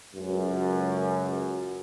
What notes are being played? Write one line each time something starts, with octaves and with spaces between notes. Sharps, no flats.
C#2 F#2